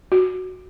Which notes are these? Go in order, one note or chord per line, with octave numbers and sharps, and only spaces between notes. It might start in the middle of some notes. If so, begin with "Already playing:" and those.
F#4